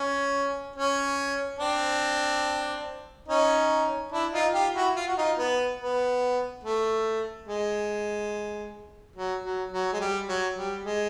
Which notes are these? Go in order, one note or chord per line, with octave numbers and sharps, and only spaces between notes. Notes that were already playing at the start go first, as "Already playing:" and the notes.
Already playing: C#4
C#4
C4 D4
C#4 D#4
D4 E4
D#4 F4
F4 G4
E4 F#4
F4
F#4
D#4 F4
B3
B3
A3
G#3
F#3
F#3
F#3
G#3
G3
F#3
G3
G#3